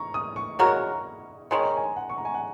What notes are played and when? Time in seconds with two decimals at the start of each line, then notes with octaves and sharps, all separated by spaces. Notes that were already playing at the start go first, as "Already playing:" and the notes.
Already playing: A#5 C#6
0.14 D#6
0.36 C#6
0.59 C#3 G#3 F#4 A#4 A#5
0.67 C#6
0.76 A#5
1.51 D#3 G#3 C#4 G#5
1.64 A#5
1.77 G#5
1.96 F#5
2.09 C#6
2.18 A#5
2.25 G#5
2.34 F#5